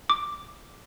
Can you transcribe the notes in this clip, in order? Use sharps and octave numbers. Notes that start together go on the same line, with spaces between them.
D6